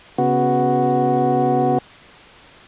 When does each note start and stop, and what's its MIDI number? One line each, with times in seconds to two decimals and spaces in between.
0.18 1.78 49
0.18 1.78 59
0.18 1.78 66